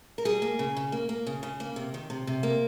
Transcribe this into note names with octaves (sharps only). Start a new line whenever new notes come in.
A#4
G3 G#4
A#3
C#3
C#3
A#3
A#3
C#3
C#3
A#3
C3
D#3
C3
C3
A#3